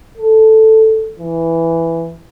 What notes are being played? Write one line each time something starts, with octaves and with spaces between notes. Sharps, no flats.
A4
E3